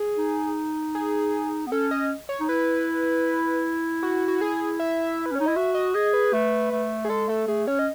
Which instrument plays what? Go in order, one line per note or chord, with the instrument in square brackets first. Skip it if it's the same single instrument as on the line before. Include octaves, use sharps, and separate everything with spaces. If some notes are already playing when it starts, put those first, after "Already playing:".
Already playing: [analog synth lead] G#4
[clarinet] D#4
[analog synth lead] G#4
[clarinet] B3
[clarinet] C#4 [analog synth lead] A4
[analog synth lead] D#5
C#5
[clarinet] D#4
[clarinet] E4 [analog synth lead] B4
[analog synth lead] F#4
F#4
G#4
E5
B4
[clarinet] C#4
[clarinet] D#4 [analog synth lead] C#5
[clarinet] E4 [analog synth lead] D#5
[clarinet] F#4 [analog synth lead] E5
[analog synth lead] D#5
[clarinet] G#4 [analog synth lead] D#5
[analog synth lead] B4
[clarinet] A3
A3
[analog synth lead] G#4
[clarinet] G#3 [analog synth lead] A4
[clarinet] A3 [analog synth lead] A4
[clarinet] A3 [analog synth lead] G#4
[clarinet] C#4 [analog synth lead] C#5
[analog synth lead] D#5